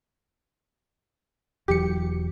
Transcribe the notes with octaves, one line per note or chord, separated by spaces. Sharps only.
E1 E2 F#3 G4 C#7